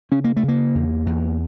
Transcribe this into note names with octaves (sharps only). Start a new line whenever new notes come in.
C#3 C#4
A#3
A3
C#3
A#3
E2
E2